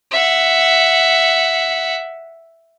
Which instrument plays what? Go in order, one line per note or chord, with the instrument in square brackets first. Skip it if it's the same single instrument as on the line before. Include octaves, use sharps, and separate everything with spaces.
[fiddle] E5 F#5